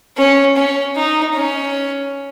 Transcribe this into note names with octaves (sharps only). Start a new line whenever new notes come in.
C#4
C#4
D#4
C#4